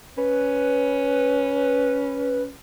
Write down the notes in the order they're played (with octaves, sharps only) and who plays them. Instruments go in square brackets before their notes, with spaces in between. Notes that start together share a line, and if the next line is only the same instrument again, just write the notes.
[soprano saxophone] C#4 [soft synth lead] B4